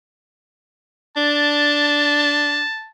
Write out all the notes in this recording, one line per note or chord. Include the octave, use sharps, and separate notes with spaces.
D4 A5